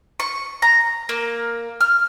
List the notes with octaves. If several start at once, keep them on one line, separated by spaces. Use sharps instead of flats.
C#6
A#5
A#3
F6